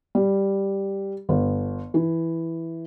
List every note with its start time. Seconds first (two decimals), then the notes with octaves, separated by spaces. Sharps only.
0.15 G3
1.29 G1
1.94 E3